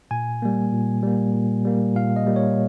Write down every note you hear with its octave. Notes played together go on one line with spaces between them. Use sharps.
A#2 G#5
G3 A#3
A#2
G3 A#3
A#2
G3 A#3
A#2 F5
D#5
G3 A#3
C#5